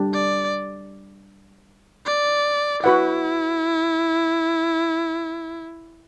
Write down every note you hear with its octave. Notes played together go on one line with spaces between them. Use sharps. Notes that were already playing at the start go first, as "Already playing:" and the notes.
Already playing: G3 D4 G4
D5
D5
E4 F#4 B4 F#5